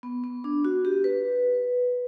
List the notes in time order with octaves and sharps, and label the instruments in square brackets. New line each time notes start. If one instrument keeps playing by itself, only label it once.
[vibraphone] B3
B3
D4
F#4
G4
B4